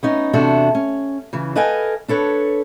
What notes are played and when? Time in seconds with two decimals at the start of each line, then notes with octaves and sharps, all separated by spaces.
0.03 B3 C#4 D#4
0.33 E2 C3 D4 F#4 A4 E5
0.75 C#4
1.33 C#3 E3
1.55 A4 B4 D#5 F5 G5 G#5
2.08 D4 A4 B4 C#5